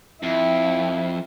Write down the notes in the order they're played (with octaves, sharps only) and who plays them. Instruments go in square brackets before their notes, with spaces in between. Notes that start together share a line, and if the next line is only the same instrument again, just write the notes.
[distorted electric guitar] F2 [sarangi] E4